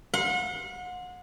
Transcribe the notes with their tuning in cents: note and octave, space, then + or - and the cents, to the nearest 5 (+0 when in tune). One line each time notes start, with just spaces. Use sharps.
F#5 -35 C6 -5